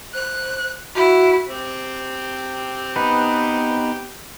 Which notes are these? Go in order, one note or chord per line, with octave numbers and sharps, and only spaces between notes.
C5 F#6
E4 F#4
C4 G4
B3 D#4 B4